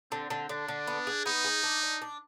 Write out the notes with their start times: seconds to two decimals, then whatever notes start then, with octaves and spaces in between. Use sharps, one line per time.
0.11 D3 C4
0.30 D3
0.49 D3 D4
0.68 D3
0.87 B3
1.07 G#4
1.25 B3 D#4
1.44 G#4
1.63 D4
1.83 D4
2.02 D4